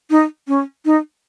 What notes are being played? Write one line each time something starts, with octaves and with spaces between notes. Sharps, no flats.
D#4
C#4
D#4